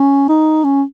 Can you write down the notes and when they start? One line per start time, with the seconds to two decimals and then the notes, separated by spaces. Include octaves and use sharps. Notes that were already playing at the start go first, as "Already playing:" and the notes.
Already playing: C#4
0.29 D#4
0.64 C#4